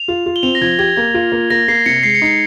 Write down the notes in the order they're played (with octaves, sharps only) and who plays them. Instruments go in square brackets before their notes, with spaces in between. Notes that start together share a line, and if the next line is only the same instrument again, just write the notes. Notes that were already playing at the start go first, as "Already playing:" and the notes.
Already playing: [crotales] F7
[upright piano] F4
F4
[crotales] G7
[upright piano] C4 [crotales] F7
[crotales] A#6
[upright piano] F3 [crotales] G#6
[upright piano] G4 [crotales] G#6
[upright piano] A#3 [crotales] G#6
[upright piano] F4
A#3
[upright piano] A#3 [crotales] A#6
[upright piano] A#3 [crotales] C7
[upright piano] C3 [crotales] C#7
[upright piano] G#3 [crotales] C7
[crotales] C#7
[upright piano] D#4 [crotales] C7